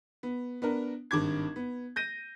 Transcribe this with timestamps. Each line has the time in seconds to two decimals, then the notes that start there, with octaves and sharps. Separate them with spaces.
0.23 B3
0.62 B3 D4 A#4
1.11 G#1 G2 D6 G#6
1.56 B3
1.96 G6 A#6 D#7